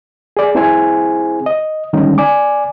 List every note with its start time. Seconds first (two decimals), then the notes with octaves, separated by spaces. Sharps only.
0.37 G#4 D5
0.55 C4 E4 G#4 C5 G#5
1.46 D#5
1.93 D3 D#3 G3 G#3 C#4 D#4
2.18 D5 G#5 D6